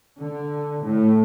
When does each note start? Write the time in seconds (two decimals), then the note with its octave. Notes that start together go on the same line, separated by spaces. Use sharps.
0.21 D3
0.84 A2